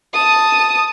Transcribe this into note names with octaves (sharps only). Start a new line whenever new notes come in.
A5 D#6